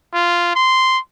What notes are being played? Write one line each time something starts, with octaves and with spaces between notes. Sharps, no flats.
F4
C6